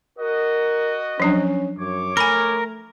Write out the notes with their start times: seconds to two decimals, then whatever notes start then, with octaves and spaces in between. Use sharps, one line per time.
0.19 F#4 A#4 D#5
1.20 F3 F#3 C#4 D4
1.78 F#2 C#5 D6
2.17 A3 A#4 G#5 A#5 B5